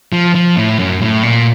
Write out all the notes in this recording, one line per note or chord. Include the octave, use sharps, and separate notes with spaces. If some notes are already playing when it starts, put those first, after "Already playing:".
F3
F3
A2
F#2
A2
A#2